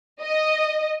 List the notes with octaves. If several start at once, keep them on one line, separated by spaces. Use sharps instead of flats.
D#5